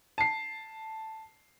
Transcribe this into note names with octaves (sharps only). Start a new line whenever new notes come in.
A5 C7